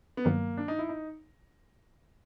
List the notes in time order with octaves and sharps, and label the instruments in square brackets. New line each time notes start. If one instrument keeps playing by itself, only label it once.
[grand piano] B3
[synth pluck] G2 D#3 F#3 [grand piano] A#3
[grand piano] D4
D#4
E4
D#4